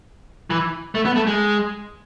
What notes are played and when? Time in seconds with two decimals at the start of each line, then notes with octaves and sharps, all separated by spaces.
0.50 E3
0.95 A3
1.05 B3
1.16 A3
1.27 G#3